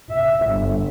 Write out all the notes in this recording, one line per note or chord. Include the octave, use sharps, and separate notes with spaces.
E5
G1